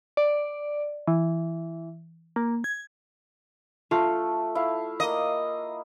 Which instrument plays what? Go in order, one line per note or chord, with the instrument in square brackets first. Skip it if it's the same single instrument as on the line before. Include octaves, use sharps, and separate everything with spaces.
[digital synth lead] D5
E3
A#3
G#6
[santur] A3 [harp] F4
[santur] E4 F5
[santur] A#3 [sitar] D#5